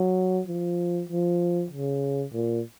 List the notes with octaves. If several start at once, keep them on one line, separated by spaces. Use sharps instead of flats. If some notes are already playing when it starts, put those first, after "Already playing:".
Already playing: F#3
F3
F3
C#3
A#2